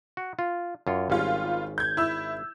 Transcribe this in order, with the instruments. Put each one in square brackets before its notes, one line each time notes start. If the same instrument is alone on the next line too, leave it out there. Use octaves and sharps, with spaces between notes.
[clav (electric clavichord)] F#4
F4
F#2 F4 C#5
[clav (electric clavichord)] G#1 C#4 [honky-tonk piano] G3 F4
[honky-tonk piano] G6 G#6
E4 E6